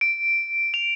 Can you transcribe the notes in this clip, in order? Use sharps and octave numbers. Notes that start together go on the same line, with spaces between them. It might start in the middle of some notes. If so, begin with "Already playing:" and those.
D7
F7